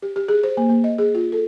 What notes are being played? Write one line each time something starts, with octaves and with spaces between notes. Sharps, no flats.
G4
G4
G#4
C5
A#3
A#3
D#5
G#4
F4
A4